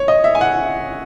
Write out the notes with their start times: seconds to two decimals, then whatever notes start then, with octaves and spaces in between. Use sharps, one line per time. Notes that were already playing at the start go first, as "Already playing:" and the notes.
Already playing: C#5
0.08 D#5
0.24 E5
0.35 G#5
0.41 F#5